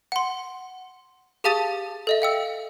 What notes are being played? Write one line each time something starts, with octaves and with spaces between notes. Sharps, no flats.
F#5 C6
G4 G#4 F5 A5 D#6 A6
A4 D#5 E5
F5 G5 E6